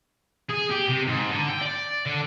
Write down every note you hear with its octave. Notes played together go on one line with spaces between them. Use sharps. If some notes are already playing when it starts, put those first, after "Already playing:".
G#4
G4
C3
G#2
D3
G5
D5
D3